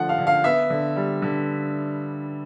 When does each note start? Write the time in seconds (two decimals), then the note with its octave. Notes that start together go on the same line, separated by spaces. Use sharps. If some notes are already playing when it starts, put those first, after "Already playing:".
Already playing: D3 F3 A3 F#5
0.09 F5
0.18 D3
0.27 F5
0.44 B3 E5
0.70 D3
0.96 G3
1.22 D3